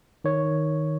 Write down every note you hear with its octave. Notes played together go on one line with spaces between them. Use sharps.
D#3 C#5